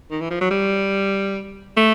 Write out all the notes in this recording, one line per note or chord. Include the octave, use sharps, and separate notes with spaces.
D#3
E3
F3
F#3
G3
A3